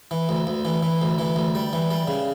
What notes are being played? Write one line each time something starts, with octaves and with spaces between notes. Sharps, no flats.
E3
D2
D2
E3
E3
D2
E3
D2
G3
E3
G3
C#3